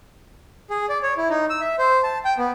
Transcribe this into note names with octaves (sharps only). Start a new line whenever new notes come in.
G#4
D5
C#5
E4
D#4
E6
E5
C5
A5
G5
B3